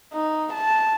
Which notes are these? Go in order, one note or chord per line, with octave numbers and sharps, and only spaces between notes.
D#4
A5